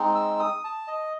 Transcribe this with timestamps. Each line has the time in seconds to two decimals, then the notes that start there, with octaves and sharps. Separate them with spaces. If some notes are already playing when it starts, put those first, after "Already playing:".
Already playing: G#3 C4 D#4
0.15 E6
0.39 D#6
0.64 A5
0.88 D#5